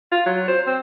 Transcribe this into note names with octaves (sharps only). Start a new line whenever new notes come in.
F4
F#3
C5
C4